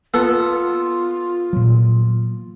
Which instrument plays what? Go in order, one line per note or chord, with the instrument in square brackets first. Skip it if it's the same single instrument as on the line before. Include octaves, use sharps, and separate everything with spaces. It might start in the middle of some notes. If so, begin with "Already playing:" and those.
[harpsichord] B3 A4 [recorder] F4
[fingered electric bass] A#2 F#3